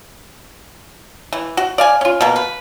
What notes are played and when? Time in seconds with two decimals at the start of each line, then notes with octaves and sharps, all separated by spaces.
1.33 E3
1.57 F#4
1.78 D5 F5 G#5
2.01 C#4 F4
2.21 B2 A#3
2.36 B4